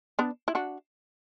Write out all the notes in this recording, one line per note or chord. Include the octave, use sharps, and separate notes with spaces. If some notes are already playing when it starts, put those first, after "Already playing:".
B3 D4
E4
D4 F#4